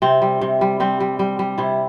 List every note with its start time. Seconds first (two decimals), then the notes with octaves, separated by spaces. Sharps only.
0.02 C3 C4
0.22 G3
0.41 C3
0.61 G3
0.80 G3 C4
1.00 G3
1.19 G3
1.39 G3
1.58 C3 E4